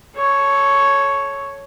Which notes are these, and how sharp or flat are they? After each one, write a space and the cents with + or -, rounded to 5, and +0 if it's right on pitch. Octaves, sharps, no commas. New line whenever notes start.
A4 -15 C#5 +0